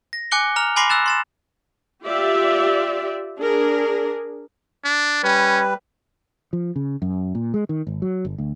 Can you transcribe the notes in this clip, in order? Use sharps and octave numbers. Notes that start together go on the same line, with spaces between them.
A#6
G#5 D6 F#6 C#7 G7
A#5 F6 F7
G#5 B5 C6 D6 A#6 C7
E6 F#6 A6 E7
C6 A6 E7
F4 G4 D5 E5
D4 G#4 A#4
D4
G3 C#4 B4
F3
C#3
F#2
A#2
G#3
D#3
G#1
F#3
G1
D2